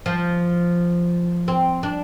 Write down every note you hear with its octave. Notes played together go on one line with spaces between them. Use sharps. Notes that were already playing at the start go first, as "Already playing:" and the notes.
F3
C4
D4